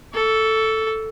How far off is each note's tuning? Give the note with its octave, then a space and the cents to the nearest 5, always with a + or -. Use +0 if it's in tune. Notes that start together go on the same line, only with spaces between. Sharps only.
A4 +0 C#6 +40